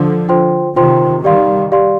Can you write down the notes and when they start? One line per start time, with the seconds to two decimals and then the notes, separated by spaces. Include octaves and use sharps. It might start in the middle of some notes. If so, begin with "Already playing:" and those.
Already playing: D3 F3
0.29 F4 C5 G5 C6
0.76 C3 D#3 F4 C5 G5 C6
1.24 D#3 G3 G4 D5 F5 C6
1.72 G4 D5 F5 C6